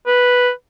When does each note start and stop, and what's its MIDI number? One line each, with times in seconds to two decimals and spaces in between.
0.07 0.51 71